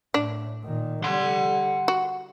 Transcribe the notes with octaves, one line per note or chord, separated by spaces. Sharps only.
A2 D4
A#2 D#3
D3 G3 F#5 C6
F#4